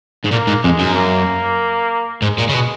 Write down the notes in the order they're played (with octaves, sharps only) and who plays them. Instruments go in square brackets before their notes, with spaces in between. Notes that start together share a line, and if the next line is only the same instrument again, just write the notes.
[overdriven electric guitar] G#2
[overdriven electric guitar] A#2 [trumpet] A#3
[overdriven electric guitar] G#2
[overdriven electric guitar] F2 [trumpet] G#3
[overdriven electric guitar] F#2
[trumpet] A#3
[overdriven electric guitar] G#2 [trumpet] G#3
[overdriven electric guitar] A#2
C#3
B2